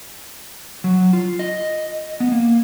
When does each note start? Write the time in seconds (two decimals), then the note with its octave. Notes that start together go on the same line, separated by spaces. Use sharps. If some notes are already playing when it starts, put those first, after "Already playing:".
0.84 F#3
1.13 F4
1.39 D#5
2.20 B3
2.32 A#3